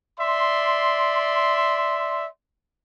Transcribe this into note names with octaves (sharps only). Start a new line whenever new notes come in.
D5 E5 C6